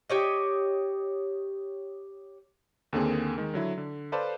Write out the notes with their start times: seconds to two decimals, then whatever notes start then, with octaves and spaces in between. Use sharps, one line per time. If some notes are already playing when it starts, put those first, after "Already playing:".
0.10 G4 C#5 D#5
2.93 D#2 D3 A#3 C4 G#4
3.38 D#3 G#3
3.54 D3 F#3 E4
3.78 D3
4.12 A4 B4 C5 D5 F5 A5